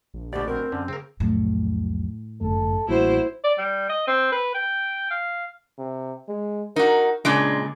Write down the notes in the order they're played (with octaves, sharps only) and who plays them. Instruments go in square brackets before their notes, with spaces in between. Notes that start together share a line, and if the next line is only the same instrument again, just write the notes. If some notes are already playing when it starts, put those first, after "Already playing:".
[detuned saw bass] A#1
[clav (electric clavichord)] D2 B2 [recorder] G4 [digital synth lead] D5
[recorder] C4 [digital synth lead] A#4
[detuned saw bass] F#2 [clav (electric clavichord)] D3 [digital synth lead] C#4
[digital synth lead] C#3 [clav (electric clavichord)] C4 A#4
[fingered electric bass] C2 F2 F#3 [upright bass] A2
[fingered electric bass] G1 F#2 A3 [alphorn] A4
[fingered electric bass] A1 G3 A#3 [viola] E4 C5 [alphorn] F#4
[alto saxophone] D5
G3
D#5
C4
B4
G5
F5
[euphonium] C3
G#3
[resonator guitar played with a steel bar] D#4 F#4 [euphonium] A#4
[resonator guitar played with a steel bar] A#2 C#3 G#3 [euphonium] D4